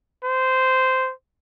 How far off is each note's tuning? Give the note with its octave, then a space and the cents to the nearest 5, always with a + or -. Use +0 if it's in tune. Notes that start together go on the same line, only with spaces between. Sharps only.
C5 -15